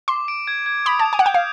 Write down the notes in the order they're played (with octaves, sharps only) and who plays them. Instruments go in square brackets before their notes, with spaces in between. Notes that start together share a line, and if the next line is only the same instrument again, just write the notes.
[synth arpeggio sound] C6 [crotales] D6
[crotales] D7
G#6
G#6
[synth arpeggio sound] B5 [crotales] D#6
[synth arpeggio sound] A5
[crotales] F7
[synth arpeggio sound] G#5
F#5
[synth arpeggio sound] G5 [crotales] G6
[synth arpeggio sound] F5